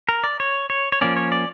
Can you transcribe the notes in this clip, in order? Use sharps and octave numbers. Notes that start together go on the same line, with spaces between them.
A#4
D5
C#5
C#5
C#5
F3 A#3 C#4 D5
C#5
D5